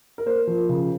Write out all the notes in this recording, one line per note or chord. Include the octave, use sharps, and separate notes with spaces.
A#4
A#3 C5
F3
C#3